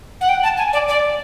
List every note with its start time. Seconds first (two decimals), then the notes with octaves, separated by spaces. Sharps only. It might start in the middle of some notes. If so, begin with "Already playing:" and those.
0.21 F#5
0.29 G5
0.43 A5
0.58 G#5
0.73 D5
0.88 D5